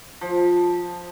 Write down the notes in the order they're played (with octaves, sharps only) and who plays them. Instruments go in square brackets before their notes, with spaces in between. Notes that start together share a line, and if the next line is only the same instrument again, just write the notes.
[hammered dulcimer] F3